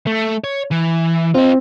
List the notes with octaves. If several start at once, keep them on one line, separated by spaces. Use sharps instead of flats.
A3
C#5
E3
C4 F4 D#5